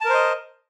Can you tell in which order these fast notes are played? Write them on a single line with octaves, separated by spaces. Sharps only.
A5 A#4 C5 D#5